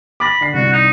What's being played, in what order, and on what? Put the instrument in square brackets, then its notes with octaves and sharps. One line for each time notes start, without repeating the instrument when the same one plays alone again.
[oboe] B5 [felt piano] D6 A6 A#6
[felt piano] D3 C7
[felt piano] C2 G2 [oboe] F#4
[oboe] D#4